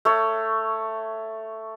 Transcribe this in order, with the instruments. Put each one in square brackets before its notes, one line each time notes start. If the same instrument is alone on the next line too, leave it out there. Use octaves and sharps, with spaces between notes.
[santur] A3 C#5